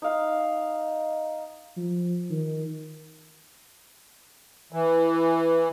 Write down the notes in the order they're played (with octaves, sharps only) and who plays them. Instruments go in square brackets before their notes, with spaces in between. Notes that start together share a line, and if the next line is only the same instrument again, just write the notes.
[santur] D#4 F5
[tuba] F3
D#3
[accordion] E3